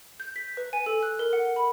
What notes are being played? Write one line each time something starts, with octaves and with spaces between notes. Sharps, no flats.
G6
B6
B4
G#5
A4
F#6
A#4
F#5
B5